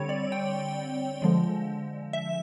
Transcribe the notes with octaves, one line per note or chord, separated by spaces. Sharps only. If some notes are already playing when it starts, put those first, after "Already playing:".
Already playing: D3 G3 C4 C#5
D5
G5
D3 F3 G#3
E5